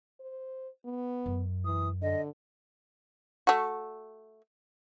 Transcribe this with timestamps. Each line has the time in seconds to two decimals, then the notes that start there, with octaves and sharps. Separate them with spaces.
0.20 C5
0.85 B3
1.26 F#2
1.65 E3 D#6
2.02 D3 D#5
3.47 A3 F#4